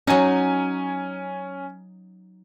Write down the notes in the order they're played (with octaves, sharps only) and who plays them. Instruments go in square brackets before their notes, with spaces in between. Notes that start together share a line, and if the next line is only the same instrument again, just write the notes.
[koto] F#3 D#4 [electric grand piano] C#4 G#5